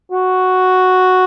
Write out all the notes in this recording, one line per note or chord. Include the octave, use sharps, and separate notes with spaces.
F#4